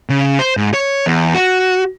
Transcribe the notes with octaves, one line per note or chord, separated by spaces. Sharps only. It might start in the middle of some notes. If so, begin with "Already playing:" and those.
C#3
C5
G#2
C#5
E2
F#4